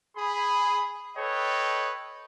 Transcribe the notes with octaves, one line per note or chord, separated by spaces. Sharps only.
G#4 B5
A4 B4 C#5 D#5 G5